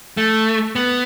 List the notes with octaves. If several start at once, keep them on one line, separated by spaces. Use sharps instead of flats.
A3
B3